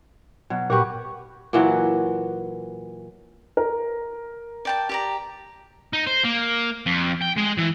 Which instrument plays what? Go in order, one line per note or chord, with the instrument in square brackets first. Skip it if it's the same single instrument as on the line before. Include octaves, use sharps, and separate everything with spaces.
[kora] B2 F#3
[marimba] A#2 C#6 [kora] F#4 G4 B4
[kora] A#2 E3 F#3
[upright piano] A#4
[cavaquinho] D5 G5 A5
G4 D5 A#5
[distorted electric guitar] D#4
C5
A#3
F2
G5
G#3
E3